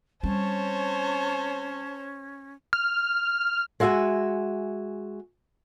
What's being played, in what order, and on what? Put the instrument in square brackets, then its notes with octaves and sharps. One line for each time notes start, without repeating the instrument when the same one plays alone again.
[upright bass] G3 C4 [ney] C#4 [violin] C5 C#5 [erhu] A5
[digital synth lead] F6
[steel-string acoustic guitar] G#3 F#4 E5 F5 G#5